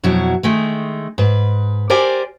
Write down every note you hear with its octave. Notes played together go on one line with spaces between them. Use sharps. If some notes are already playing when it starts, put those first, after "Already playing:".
F2 B2 F#3 E4
D#3 G#3 A3
G#2 B4
G4 A#4 C5 D5 G#5